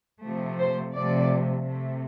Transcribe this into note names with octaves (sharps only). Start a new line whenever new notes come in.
C3 F3 A3
C5
C3 F3 A3 D5
C3 A3